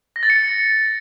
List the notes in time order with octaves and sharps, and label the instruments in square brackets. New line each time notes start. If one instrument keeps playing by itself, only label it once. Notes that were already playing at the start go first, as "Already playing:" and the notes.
[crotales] A#6
A6
C#7